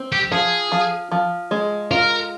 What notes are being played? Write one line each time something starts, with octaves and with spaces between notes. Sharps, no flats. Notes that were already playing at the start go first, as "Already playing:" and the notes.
Already playing: C4
G4
F3 G#4
F3
F3
G#3
F4 A#4